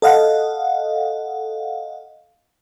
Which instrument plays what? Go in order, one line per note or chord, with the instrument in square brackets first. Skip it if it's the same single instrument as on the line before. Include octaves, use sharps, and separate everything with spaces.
[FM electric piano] A4 D#5 F5 F#5